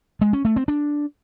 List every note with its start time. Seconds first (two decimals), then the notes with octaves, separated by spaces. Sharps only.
0.21 G#3
0.33 C#4
0.45 A3
0.56 C4
0.68 D4